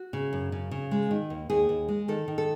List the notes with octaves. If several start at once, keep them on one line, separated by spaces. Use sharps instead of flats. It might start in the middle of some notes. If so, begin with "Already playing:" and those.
Already playing: F#4
C#3
F#2
C#3
C#3
G#3
D#3
D#2
D#2 G#4
D#2
G#3
D#3 A4
D#3
A4